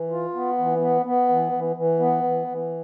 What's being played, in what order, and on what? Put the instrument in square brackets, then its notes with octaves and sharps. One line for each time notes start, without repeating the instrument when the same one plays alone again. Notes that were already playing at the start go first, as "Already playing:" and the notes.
Already playing: [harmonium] E3
F4
B3
E3
B3
B3
E3
E3
E3
B3
E3
E3